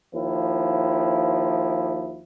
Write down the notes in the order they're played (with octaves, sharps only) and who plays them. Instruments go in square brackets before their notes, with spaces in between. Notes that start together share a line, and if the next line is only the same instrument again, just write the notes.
[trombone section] D#2 F3 E4